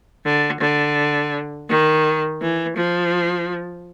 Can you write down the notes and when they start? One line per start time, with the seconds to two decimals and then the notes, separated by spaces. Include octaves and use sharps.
0.25 D3
0.61 D3
1.69 D#3
2.41 E3
2.77 F3